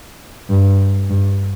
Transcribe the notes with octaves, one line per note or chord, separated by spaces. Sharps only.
G2
G2